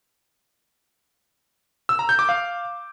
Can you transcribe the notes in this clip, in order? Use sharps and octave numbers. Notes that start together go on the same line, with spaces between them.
E6
A#5
G6
D6
F5